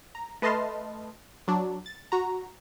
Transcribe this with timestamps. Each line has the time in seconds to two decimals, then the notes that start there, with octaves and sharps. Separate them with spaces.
0.15 A#5
0.42 A3 B4 D#5 A5 C6 F6
1.48 F#3 D4
1.86 A6
2.12 F#4 A#5